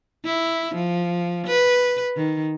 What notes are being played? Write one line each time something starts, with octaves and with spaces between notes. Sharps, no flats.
E4
F3
B4
D#3